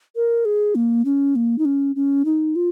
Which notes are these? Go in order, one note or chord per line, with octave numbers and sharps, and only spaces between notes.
A#4
G#4
A#3
C#4
A#3
D#4
C#4
C#4
D#4
F4